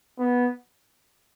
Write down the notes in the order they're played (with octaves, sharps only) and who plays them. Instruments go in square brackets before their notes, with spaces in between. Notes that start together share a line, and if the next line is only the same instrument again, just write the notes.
[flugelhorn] B3